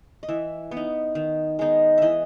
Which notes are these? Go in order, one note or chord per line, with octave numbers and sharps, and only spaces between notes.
D#5
E3 E5
B3
D#4
D#3
G#3 B3 D#4
E3 D#5 E5